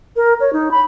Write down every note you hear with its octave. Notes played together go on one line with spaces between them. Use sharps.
A#4
C#5
D#4
B5